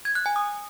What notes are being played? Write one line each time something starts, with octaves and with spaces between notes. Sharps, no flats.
G#6
F#6
G#5
D#6